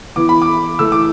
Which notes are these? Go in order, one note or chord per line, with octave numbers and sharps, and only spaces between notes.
E3 B3 E4 D6
B5
D6
E3 A3 E4 E6
D6